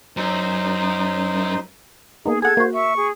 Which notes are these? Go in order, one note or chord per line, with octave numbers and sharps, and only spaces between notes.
F#2 D#4 C5
A#3 B3 D#4 G#4
G#4 A4 F#5 G#6
A#3 F#4 C5
E5 C#6
G#4